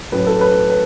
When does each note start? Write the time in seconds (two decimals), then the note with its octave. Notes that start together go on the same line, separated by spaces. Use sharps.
0.12 A2 F#3 A3 C#4 B4
0.27 A4
0.41 B4
0.70 B4